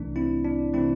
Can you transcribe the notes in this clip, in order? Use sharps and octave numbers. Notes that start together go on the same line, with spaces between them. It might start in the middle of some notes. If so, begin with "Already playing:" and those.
Already playing: C2 C3 E3 A3 D4
C4 E4
D4
C3 E3 A3 C4 E4